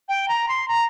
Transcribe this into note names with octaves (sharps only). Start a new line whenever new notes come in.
G5
A#5
C6
A#5